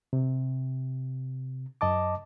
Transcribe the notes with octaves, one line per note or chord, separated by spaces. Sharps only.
C3
F#2 D#5 A5 D6